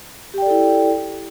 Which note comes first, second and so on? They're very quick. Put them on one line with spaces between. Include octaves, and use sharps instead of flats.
G4 G5 D5 A4 E4